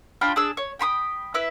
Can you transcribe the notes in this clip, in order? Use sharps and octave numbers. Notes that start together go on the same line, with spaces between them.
D4 F4 G5 B5
D4 G#4 E6
C#5
G5 B5 C6 D#6
E4 B4 E5